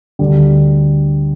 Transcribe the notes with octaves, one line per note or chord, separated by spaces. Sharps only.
D2 D3 G3